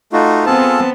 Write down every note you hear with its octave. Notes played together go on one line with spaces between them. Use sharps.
A3 D#4 F4 F#4
B3 C4 F4 G#4 A4 A5